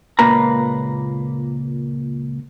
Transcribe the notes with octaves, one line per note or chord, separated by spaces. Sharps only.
C#2 A#2 A#3 B4 A#5